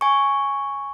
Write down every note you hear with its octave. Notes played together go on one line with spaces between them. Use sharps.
G#5 C#6